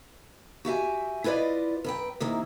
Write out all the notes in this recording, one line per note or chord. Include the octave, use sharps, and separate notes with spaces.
F#4 G4 E5 G#5
E4 F4 B4 D5 D#5
F#2 B4 G5
C3 D#3 A#3 E4